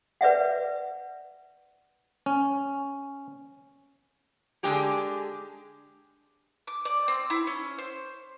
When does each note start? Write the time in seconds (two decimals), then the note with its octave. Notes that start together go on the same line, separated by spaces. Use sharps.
0.21 B4 D5 E5 F#5
2.26 C#4
4.63 D3 G#3 D4 G4 G#4
6.67 D6
6.85 D5
7.08 C4
7.30 E4
7.47 C#4
7.78 C5